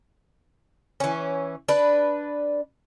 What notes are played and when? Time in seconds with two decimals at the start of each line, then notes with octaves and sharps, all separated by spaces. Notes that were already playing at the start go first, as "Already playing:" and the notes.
1.00 E3 C#4
1.68 D4 B4